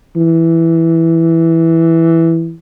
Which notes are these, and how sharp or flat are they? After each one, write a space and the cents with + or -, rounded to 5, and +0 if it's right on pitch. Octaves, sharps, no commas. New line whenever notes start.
E3 +0